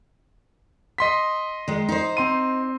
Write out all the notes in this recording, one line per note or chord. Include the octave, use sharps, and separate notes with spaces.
D#5 C6 B6
D#3 G#3
D#4 C5
C4 C6 D#7